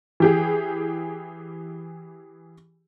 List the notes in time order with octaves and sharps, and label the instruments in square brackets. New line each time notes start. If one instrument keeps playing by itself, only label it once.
[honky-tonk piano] E3 G4 G#4